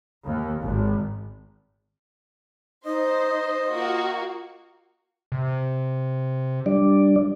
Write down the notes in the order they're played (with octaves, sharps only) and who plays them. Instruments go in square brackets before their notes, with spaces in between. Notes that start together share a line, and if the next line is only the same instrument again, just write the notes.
[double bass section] D#2
G#1
[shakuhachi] D#4 [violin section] C5 [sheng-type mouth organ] D#5
[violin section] A#3 F#4 [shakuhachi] F4
[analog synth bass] C3
[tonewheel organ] G3 D4 D5